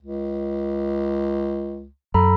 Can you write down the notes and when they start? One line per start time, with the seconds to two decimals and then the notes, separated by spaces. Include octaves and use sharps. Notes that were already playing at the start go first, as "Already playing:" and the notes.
0.03 C#2
2.14 F#2 A4 A#5 B5